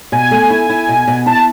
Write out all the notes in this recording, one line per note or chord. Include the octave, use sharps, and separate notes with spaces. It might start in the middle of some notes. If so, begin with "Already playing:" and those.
B2 G#5
A3
E4
E4
B2
B2
E4 A5